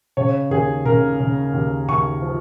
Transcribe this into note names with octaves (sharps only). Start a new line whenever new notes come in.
C#3 C#5
D#2 G#4
C#3 A#4
C#3
D#2
D#2 C#6
F3